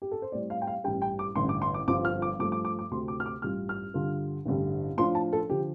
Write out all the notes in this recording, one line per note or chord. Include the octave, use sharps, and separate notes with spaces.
G4
A4
C5
A2 G3 C4 D5
F5
G5
F5
A1 G2 G3 G5
G5
D6
A1 G2 D3 C6
D6
C6
D6
G1 G2 F3 C4 F4 D6
F6
D6
G2 F3 A3 D6
D6
D6
D6
D2 C3 A3 C6
D6
F6
D6
A1 G2 G3 F4 F6
F6
G2 D3 G3 F4
A1 G2 D3 G3
A2 F3 D4 F4 C6
A5
A4
D3 F3 G4